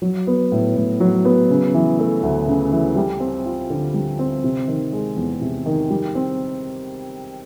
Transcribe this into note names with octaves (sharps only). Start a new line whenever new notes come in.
F#3
B3
A2
A2
F#3
B3
C#3
E3
A3
D2
C#3
E3
G3
C4
F4
D3
G3
C4
C3
D#3
G#3
E2
C3
D#3
G3
C4